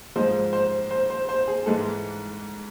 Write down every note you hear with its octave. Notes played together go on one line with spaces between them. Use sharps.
G#2 F3 G#3 C5
C5
C5
C5
C5
G#4
G#2 E3 G#3 A4